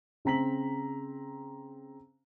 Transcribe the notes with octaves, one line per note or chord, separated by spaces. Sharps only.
C#3 C4 A#5 B6 F#7